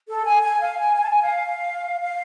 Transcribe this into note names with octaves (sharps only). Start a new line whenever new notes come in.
A4
G#5
G#5
F5
G#5
G#5
A5
G#5
F5
F5